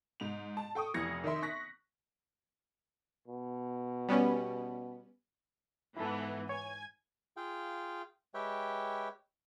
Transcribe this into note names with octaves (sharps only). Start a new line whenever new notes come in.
G#2 F7
A5
A4 G5 C#6 D#6
F1 E3 G#6 A#6 C#7
D#3 D#4 A#4 E5 C6
C#6 F#6 A#6 B6
B2
G3 B3 C#4
G#2 E3 B3 E4 A4
C#5 G#5 G#6
F4 G#4 F5 G5
G#3 G4 B4 C#5 E5 G5